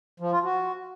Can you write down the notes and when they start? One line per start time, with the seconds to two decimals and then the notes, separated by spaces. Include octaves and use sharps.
0.20 F3
0.32 F4
0.44 F#4